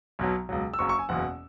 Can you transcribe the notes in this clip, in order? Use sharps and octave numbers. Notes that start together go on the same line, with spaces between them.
B1 B2 F#3
C#2 B2 F#3
E6
F#1 F#2 F#3 C#6
C#6
G#5
F#1 E2 B2 F#5